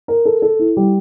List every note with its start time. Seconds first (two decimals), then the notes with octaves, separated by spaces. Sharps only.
0.08 A#4
0.25 A4
0.42 A4
0.59 E4
0.77 G3